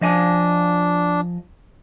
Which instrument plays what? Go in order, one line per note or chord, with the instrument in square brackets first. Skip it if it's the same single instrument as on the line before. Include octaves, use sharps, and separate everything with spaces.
[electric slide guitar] F3 D#5 G#5 [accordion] D4